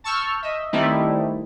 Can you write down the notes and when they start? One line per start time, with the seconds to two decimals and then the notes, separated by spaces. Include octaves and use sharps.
0.04 A5 C#6 E6 F6 G6
0.42 D#5 E5
0.73 D#3 G3 A3 C4 D#4 E4